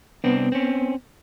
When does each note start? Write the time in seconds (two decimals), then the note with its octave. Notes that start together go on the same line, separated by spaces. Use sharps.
0.24 C2 B3 C4 D4
0.52 C4 C#4